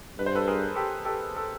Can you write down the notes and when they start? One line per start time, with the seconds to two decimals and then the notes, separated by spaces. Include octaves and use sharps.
0.19 G2 B4
0.26 C5
0.35 A4 B4
0.48 G#4 A#4
0.76 G4 A4
1.05 G4 A4
1.36 A4